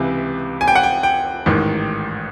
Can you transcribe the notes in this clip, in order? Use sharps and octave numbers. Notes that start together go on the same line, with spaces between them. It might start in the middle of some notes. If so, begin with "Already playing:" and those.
Already playing: C#2 C3 E3
G#5
G5
F#5
G5
G5
A1 G#2 D#3